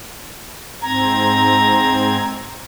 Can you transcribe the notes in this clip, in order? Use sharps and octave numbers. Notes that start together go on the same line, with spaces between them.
G#2 C4 A#5 G#6